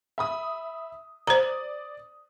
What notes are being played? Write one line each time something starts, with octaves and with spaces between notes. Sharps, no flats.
E5 B5 D#6
C5 D5 A#5 D#6 F#7